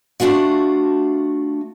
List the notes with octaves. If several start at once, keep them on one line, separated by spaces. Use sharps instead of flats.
A3 D4 F4 F#4 F5